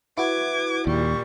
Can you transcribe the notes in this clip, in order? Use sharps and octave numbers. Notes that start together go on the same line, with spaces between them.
E4 F#4 B4 D6 G#6
D#2 A#2 G3 C#6